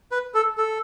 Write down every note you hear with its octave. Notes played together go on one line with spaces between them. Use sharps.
B4
A4
A4